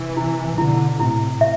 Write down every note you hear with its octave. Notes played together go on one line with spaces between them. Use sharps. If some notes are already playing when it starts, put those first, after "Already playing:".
Already playing: C3 E3
E4
B2 D3 E4
A2 C3 E4
E5